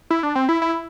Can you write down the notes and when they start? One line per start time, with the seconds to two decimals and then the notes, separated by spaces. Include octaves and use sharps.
0.10 E4
0.23 D4
0.35 C4
0.49 E4
0.62 E4